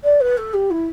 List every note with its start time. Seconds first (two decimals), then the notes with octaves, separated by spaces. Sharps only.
0.03 D5
0.20 B4
0.37 A4
0.53 G4
0.70 E4